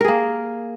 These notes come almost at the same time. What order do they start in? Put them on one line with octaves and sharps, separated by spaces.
A#4 G#4 A#3